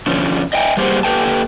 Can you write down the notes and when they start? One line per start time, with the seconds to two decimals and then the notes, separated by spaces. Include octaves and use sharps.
0.06 B2 D3 F3 C#4
0.53 D#5 E5 G5 G#5
0.77 G3 A#3 G4 G#4 C5 F#5
1.03 A#3 G4 A4 B4 G5 A5